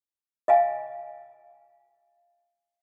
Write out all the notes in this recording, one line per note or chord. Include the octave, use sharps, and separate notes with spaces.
D#5 F5 G#5